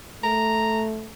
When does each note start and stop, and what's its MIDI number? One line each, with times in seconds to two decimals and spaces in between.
0.24 1.11 57
0.24 0.83 82